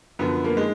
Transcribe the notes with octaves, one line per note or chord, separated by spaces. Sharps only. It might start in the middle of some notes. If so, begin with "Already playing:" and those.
F#2 D3 F3 B3
A#3
D#3 G#3